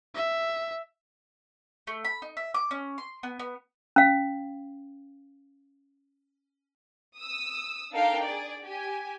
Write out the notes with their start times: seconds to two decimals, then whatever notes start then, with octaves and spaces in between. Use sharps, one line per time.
0.15 E5
1.87 A3
2.05 B5
2.22 D#4
2.37 E5
2.54 D6
2.71 C#4
2.98 C6
3.23 B3
3.39 B3
3.96 C#4 F5
7.16 D#6 E6
7.92 D4 D#4 A4 A#4 F5 G5
8.24 G#4 D5
8.64 G4 G#5